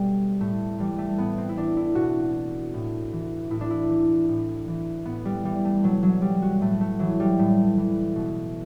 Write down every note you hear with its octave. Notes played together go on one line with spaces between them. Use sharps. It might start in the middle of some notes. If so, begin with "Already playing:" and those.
Already playing: B2 G3 A3 B3
A2 A3
E3 G3
A3
A2 B3
C4
E4
E3 D4
E4
B2 F#4
A2
E3
A2 E4
D4
E4
E3
A2
E3
A2 B3
G3
E3 G3
A3
B2 F#3
F#3
G3
F#4
A2 A3
A3
E3 F#3
G3
A2 A3
E3
B2